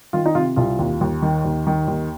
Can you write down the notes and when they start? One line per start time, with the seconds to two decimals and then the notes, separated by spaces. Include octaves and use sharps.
0.13 D#3 F4
0.26 D#4
0.35 C3 F4
0.56 C2 F4
0.79 D#2
1.01 D#2
1.22 D#3
1.45 D#2
1.67 D#3
1.88 D#2